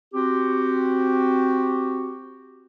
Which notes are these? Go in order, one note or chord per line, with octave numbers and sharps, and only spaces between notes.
C4 F#4 G4